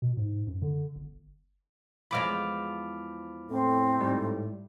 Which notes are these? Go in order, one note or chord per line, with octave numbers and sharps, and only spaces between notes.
B2
G#2
F#2
D3
G1
E2 F3 G#3 B5 D6 F6
A2 C4
G#2 G3